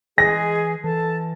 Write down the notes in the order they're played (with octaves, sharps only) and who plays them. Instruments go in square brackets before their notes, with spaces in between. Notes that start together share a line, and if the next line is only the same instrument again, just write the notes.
[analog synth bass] E3 [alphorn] G#3 [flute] G#4 [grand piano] A#6
[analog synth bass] E3 [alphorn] A4 [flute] A5